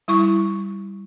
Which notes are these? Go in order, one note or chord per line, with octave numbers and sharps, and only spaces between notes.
G3 E4 C#6